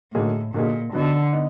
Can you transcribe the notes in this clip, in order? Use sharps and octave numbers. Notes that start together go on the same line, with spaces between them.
A2 D3 F#3 A#3 D#4 G#4
A#2 D3 F#3 A#3 D#4 G#4
D3 F#3 B3 D#4
B3 D#4